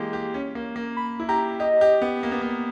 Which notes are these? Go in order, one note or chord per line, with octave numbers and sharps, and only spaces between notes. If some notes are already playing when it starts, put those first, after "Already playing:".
Already playing: E3 G#3 A#3 G4
G4
C#4
A#3
A#3
B5
E4
G4 A#5
G4 D#5
G4
B3
A#3
B3
A#3